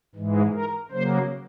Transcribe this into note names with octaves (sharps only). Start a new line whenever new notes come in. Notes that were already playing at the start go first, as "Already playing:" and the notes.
G#2 E3 G#3
A#4
C#3 F#3 A#3 C5